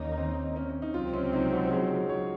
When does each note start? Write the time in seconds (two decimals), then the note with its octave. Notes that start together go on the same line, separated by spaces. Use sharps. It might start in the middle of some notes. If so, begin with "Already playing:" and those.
Already playing: D#2 D#3 A#3 C#4 D#4
0.17 C4
0.56 C#4
0.70 C#4
0.82 D#4
0.94 C#2 C3 F#3 C4 F4
1.13 C#4
1.33 D#4
1.52 F#4
1.71 G#4
2.09 C#5